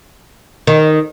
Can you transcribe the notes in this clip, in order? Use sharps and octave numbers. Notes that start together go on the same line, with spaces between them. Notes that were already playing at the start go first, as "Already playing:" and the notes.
D#3